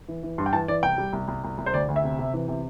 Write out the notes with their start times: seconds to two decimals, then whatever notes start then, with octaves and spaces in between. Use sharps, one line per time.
0.08 E3
0.23 E3
0.38 G2 C6
0.46 G5
0.53 E3 A5
0.68 E3 D5
0.83 C2 G5
0.98 G3
1.13 C2
1.28 C2
1.44 C2
1.58 C2
1.66 C5
1.73 D2 D5
1.88 D2
1.96 E5
2.03 C3
2.19 C3
2.34 E3
2.48 C3